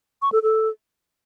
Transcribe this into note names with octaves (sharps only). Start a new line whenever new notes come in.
C#6
A4
A4